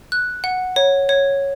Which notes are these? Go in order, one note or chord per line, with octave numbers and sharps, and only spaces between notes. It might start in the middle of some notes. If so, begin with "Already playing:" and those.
F#6
F#5
C#5
C#5